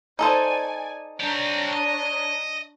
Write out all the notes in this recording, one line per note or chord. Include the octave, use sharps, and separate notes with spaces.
D#4 A4 C5 D5 G#5
G3 C4 D4 C#5 A#5
D#5